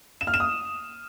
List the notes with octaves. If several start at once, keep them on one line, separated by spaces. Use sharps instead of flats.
E7
F6
E7
D#6